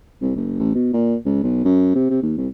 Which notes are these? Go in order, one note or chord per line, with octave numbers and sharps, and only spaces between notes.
C2
F#1
A1
B2
A#2
C#2
B1
F#2
C3
C3
D#2
C2